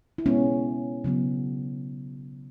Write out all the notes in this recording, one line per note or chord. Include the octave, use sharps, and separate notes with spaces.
E4
B2 G#3 B3 C#4
C#3 F#3 B3